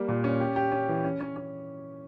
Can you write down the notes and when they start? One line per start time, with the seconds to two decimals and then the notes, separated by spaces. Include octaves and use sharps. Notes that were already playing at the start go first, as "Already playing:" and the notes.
Already playing: G3 A#3
0.08 A#2
0.24 C#4
0.40 G4
0.56 G4
0.72 C#4
0.89 E3
1.04 C#4
1.21 C#4
1.36 C#4